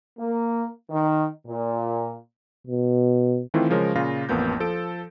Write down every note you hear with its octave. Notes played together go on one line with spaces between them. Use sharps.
A#3
D#3
A#2
B2
D#3 E3 A3 C4 E4 F4
C#3 F3 G#3 A#4 C#5
A#2 C#3 F4 A#6
A1 F2 A#3 B3 G6
F3 A4 D7